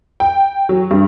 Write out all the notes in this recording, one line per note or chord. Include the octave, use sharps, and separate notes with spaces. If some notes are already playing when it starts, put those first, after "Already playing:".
G5
F#3
G2